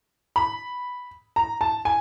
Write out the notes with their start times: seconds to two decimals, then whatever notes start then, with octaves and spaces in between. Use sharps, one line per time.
0.36 B5
1.36 A#5
1.61 A5
1.85 G#5